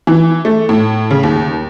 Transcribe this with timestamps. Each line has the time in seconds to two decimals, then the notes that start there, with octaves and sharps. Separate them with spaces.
0.07 E3
0.45 A3
0.69 A2
1.11 C#3
1.23 D#2